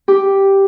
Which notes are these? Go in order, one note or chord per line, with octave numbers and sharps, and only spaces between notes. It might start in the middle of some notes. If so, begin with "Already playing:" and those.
G4